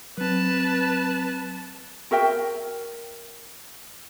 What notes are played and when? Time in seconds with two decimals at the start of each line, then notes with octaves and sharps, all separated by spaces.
0.18 F#3 C4 B4 A5
2.11 F#4 A#4 E5 G5